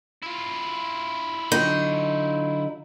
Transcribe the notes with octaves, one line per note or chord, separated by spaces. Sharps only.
E4 F4
D3 F#3 D#4